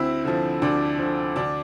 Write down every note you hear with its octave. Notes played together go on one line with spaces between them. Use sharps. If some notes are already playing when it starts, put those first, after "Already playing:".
Already playing: D2 C4 E4
D3 F3
D2 D4
D3 F3
D2 D4